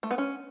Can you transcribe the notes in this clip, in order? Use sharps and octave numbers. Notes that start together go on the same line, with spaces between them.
A3
B3
C#4